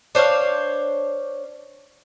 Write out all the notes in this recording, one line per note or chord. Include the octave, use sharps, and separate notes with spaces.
D4 C5 C#5 F5